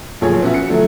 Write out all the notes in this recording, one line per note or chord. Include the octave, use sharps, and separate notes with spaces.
B1 A#2 F3 G#4 C#5
B3 C#4 F#4 E5
C#7
D3 F3 F#3 A3